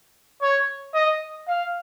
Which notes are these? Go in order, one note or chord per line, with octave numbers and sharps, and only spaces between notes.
C#5
D#5
F5